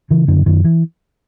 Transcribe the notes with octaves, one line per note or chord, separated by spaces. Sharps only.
C#3 E3
F#2 D3
F#2 D#3
E3